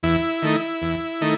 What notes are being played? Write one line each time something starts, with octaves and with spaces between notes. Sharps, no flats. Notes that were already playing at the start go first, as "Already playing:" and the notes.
E2 E4
D#3 A3 D#4
E2
D#3 A3 D#4